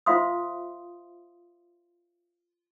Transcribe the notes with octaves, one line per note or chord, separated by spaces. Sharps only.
F4 C5 E5 F5 C6 D#6